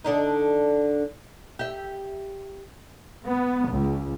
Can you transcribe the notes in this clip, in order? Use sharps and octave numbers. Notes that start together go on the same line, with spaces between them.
D3 D4 D#4
G4 E5
B3
C#2